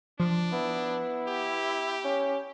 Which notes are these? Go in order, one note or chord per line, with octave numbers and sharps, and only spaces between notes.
F3 D4
B3 E4
G4
C#4